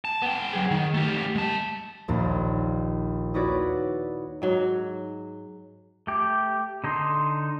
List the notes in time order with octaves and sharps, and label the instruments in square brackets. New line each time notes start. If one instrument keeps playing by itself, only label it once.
[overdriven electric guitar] A5
B3 G5
F#3 G#4
D#3
A3 G4
G#3 A5
[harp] A#1 D#2 A#2
D#4 E4 F#4 B4 C#5 D5
[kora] G#2 F#3
[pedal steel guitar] A3 G4
D3 D#4 A4 C6